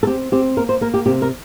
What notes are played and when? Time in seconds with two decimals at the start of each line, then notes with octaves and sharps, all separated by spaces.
0.03 A4
0.07 C4 G4
0.32 C4 G4
0.57 A#3 A#4
0.69 C5
0.81 A#3 A#4
0.94 G4
1.06 C3 G4
1.22 A#4